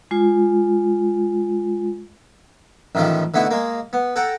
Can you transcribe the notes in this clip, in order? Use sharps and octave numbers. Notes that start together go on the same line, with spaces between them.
G#3 F4
A1 A2 D#3 F3 G3
D3 A3 B3 D#4 E4
G#3 A#3
B3
A4 F#5 G5 A#5